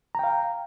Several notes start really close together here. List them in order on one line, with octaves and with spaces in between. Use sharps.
A#5 G5 F5